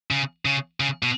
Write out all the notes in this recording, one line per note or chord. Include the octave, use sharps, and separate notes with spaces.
C#3
C#3
C#3
B2